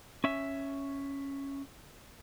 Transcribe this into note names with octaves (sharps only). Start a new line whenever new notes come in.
C#4 E5